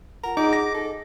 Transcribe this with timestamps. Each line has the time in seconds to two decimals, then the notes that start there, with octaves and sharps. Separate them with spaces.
0.24 F4 F#5 A#5
0.37 D#4 G#4 F#5 G#5 D6
0.53 A#6
0.74 A4 D#5